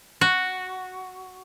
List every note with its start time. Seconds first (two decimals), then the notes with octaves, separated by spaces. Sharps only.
0.21 F#4